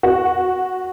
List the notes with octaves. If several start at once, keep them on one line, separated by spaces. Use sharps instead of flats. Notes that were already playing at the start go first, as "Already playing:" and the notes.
F#4